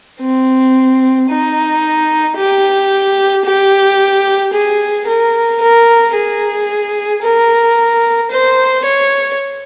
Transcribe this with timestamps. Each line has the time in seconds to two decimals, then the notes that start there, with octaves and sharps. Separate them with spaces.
0.21 C4
1.29 D#4
2.37 G4
3.45 G4
4.53 G#4
5.07 A#4
5.61 A#4
6.15 G#4
7.23 A#4
8.31 C5
8.85 C#5